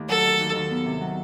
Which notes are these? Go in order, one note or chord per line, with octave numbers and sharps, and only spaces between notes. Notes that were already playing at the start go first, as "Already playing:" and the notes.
Already playing: D#2 A3
F#3 A4
D#3
D#2
D#3
B3
C3
F#3